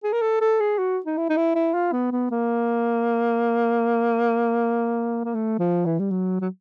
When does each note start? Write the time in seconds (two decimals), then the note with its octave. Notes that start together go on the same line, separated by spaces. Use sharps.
0.04 G#4
0.13 A#4
0.21 A4
0.41 A4
0.60 G#4
0.78 F#4
1.06 D#4
1.17 E4
1.29 D#4
1.37 E4
1.55 E4
1.74 F4
1.92 B3
2.12 B3
2.31 A#3
5.25 A#3
5.34 A3
5.59 F3
5.86 E3
5.99 G3
6.11 F#3
6.41 F#3